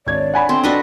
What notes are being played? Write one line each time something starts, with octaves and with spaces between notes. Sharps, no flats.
G#1 D4 C#5 D5 G#6
F#5 G#5 B5
D3 C4 E4 C6
D4 F#4 B4 D5 D#5